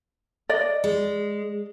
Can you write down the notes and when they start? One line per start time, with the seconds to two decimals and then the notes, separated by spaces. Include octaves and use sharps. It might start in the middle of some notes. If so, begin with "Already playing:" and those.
0.49 D5 D#5
0.84 G#3